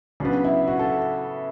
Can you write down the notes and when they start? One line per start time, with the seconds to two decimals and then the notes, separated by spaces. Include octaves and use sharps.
0.20 C#3 F#3 B3 D4
0.44 E4
0.67 F#4
0.79 A4